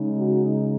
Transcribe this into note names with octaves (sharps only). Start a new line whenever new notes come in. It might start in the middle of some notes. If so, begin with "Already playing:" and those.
Already playing: C#3 G#3 D#4
F#4